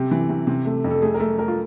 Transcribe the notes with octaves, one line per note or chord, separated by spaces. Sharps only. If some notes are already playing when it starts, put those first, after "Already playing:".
Already playing: C3 G4
E3
C3
C3
A3
F2
A4
A3 G#4
A#4
A3 A4
A3 A#4
F4